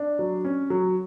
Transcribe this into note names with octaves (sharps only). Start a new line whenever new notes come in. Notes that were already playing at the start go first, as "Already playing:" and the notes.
Already playing: D4
F#3
C#4
F#3